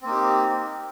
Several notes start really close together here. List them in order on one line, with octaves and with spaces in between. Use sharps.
C4 A#3 D#4 G4